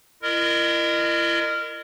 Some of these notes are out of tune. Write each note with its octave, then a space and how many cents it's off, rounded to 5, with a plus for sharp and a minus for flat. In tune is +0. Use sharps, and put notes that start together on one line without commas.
E4 +40 A#4 -10 D#5 -35